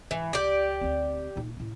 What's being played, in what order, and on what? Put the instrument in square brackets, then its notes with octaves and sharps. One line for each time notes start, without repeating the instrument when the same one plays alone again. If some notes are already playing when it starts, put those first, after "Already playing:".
[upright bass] G#2 [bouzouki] E3
[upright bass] C#2 [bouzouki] G4 D5
[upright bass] D2 C4
A#2 D#4
A2 C#4